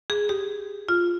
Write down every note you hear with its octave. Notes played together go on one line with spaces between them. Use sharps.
G#4
G4
F4